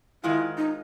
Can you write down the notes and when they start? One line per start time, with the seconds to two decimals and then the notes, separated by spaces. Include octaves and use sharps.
0.23 G#2 D#3 G#3 E4 F4
0.57 D#4